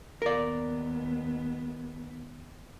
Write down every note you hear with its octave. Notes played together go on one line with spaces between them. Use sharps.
D#2 B3 A#4 D5